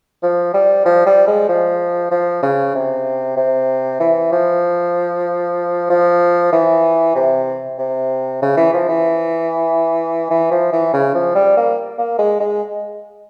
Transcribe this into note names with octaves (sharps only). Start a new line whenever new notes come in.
F3
G3
F3
G3
G#3
F3
F3
C#3
C3
C3
E3
F3
F3
E3
C3
C3
C#3
E3
F3
E3
E3
F3
E3
C#3
F3
G3
A#3
A#3
G#3
G#3